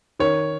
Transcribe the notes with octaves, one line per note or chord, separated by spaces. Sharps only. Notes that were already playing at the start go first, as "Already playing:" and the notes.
D#3 C#5